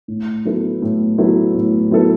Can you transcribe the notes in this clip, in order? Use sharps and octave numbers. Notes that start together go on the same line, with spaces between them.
A2
F#3 B3 E4 A4
A2
F#3 B3 E4 A4
A2
F#3 B3 E4 A4